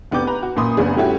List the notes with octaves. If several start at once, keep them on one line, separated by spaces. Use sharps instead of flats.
F1 B3 D4 G4 D6 G6
B4 A#5
F#4
F#2 A#2 B5 C6 D#6
F#1 B3 D4 G#4
G3 A3 C#4 E4 F#4 G4